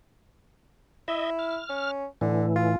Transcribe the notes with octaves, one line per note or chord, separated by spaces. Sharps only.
E4 D#5 E5
F6
C#4
A2 D3 E3
F4